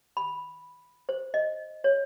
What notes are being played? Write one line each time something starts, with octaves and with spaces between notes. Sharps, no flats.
B5
C5
D#5
C#5